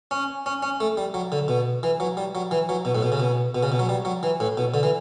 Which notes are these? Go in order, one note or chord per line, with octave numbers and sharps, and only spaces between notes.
C#4
C#4
C#4
A3
G3
F#3
D3
B2
E3
F#3
G3
F#3
E3
F#3
B2
A2
B2
C#3
B2
B2
C#3
B2
F#3
G3
F#3
E3
A2
B2
D3
E3